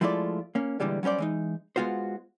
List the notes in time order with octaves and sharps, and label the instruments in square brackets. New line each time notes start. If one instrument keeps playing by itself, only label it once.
[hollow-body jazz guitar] F3 G#3 A3 E4 F4 D5
A#3 C#4
A#2 D3 E3 G3 G#3
F#3 G3 C#4 C5 D5
E3 G#3 D#4
G#3 B3 F4 F#4 C5